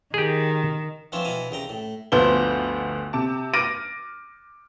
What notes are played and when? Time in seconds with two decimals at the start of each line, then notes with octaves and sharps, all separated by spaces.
0.14 D#3 G4 G#4
1.12 E3 F3 C4 D4 F4 C#5
1.25 B2 E3 F5 G#5
1.51 C2 C#3 G5 A#5
1.69 A2
2.12 G1 D2 F3 B3 C5 G7
3.13 C3 A5
3.54 D6 F6 A6 A#6 D7 D#7